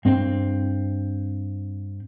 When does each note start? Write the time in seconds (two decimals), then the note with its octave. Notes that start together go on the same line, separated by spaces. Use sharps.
0.05 G2 C4